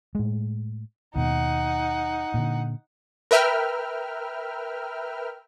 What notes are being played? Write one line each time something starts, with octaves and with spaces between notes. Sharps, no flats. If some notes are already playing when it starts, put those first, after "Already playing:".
A2 G#3
D#2 B2 D#4 F#5
A#2 D3
A#4 B4 E5 G5 F6